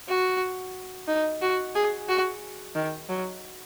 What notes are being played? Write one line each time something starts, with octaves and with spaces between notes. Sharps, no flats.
F#4
D#4
F#4
G#4
F#4
D#3
F#3